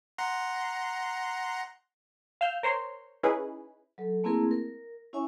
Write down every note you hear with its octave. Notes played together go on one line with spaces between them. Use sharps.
F#5 A#5 C6
F5 E6 F6 G6
A#4 C5 C#5 C6
C#4 D#4 E4 G#4 B4
F#3 A4
A3 A#3 C4 E4 G#4 A#4
A#4
C#4 E4 C#5 E5 G#5 C#6